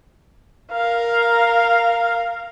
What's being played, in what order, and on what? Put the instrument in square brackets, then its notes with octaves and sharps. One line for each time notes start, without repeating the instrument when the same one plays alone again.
[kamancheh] A#4 F5